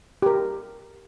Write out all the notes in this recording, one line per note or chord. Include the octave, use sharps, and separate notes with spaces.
G4 A#4